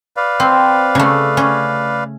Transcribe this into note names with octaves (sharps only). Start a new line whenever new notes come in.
B4 D5 F5
C4
C#3 A3
C#4